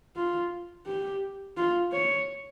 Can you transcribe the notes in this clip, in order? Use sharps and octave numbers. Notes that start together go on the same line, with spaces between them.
F4
G4
F4
C#5